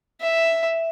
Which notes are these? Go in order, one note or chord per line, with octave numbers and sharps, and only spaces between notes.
E5